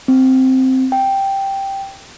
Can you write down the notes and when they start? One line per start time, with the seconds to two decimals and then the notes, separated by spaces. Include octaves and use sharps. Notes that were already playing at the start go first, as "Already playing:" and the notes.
0.08 C4
0.92 G5